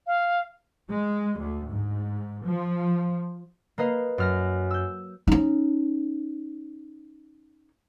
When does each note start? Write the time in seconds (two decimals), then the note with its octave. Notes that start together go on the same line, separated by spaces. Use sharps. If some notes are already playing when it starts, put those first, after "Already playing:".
0.07 F5
0.89 G#3
1.38 D2
1.69 G#2
2.44 F3
3.78 A#3 B4 D#5 F5
4.18 F#2 F6 A#6
4.71 E6 G6
5.27 C#4 D#4